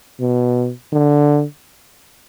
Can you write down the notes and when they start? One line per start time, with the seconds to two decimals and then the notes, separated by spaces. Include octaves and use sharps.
0.20 B2
0.93 D3